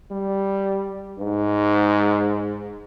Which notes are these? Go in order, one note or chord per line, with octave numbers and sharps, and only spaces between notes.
G3
G#2